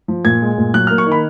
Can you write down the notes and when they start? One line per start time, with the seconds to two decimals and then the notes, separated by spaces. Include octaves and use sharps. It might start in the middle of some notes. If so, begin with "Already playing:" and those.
0.08 F3
0.25 A#2 G#6
0.42 G#3
0.58 A#2
0.74 F#3 F#6
0.87 F6
0.91 A#3
0.98 C#6
1.07 D#3
1.12 B5